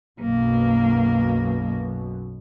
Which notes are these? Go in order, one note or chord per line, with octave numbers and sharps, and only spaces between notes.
B1 F#2 B2 A#3